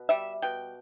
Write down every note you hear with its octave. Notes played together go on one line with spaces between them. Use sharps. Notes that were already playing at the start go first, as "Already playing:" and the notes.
Already playing: B2
G3 E5
B2 G5